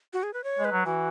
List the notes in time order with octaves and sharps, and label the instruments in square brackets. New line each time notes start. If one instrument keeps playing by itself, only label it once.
[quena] F#4
G#4
B4
C#5
[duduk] G#3
[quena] B4
[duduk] F#3
[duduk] E3 [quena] F#4